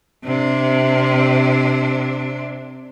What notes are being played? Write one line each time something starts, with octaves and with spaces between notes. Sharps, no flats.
C3 D4